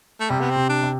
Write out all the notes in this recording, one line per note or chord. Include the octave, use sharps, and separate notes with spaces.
A3
C3 G3
B3
C4
C3
D4
C3